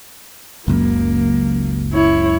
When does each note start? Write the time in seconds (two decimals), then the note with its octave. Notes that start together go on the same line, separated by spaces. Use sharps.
0.68 F#1 C#2 F#2 A#3
1.93 E4 C#5